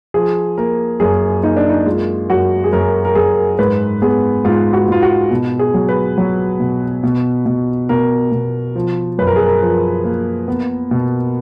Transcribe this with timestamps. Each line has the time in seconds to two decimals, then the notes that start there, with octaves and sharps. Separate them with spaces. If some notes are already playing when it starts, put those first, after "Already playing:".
0.14 F3 G#4
0.57 A#3 A#4
1.00 F#2 G#4
1.43 A#3 D#4
1.57 D4
1.69 D#4
1.86 G#3 F4
2.30 F#2 F#4
2.64 G#4
2.72 F#2 A#4
3.05 A#4
3.15 F#2 G#4
3.59 G#2 B4
4.02 B3 G#4
4.45 G#2 F4
4.73 F#4
4.88 G#2 F4
5.02 F#4
5.31 B2
5.59 G#4
5.74 F#3
5.89 B4
6.18 F#3
6.60 B2
7.03 B2
7.46 B2
7.89 B2 A#4
8.32 B2
8.75 F3
9.18 F#2 B4
9.27 A#4
9.36 G#4
9.46 A#4
9.62 F3
10.04 A#3
10.48 B3
10.91 B2